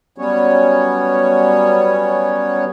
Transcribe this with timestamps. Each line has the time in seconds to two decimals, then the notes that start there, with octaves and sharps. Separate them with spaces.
0.18 F#3 G3 B3 C#4 C#5